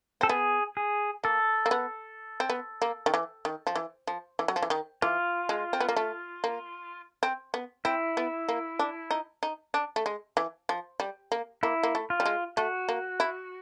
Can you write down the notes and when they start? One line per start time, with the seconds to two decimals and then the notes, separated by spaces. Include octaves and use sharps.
0.21 C4 A4
0.29 B3 G#4
0.77 G#4
1.24 A#3 A4
1.66 A#3
1.71 B3
2.40 C4
2.49 B3
2.82 A#3
3.06 D#3
3.14 E3
3.45 D#3
3.67 F3
3.75 E3
4.07 F3
4.39 E3
4.48 F#3
4.56 F3
4.62 E3
4.70 D#3
5.02 E3 F4
5.49 G#3
5.73 C4
5.80 B3
5.89 A#3
5.96 A3
6.44 A#3
7.23 C4
7.54 B3
7.85 C4 E4
8.17 B3
8.49 A#3
8.79 D4
9.11 D#4
9.43 D#4
9.74 D4
9.96 A3
10.06 G#3
10.37 E3
10.69 F3
11.00 G3
11.32 A#3
11.63 A#3 E4
11.83 A#3
11.95 A3
12.10 F4
12.20 G3
12.25 G#3
12.57 A3 F#4
12.89 A#3
13.20 E4